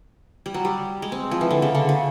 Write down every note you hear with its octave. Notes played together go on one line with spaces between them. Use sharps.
G3
F#3
G3
G#3
C4
F3
E3
D3
C#3
D3
C#3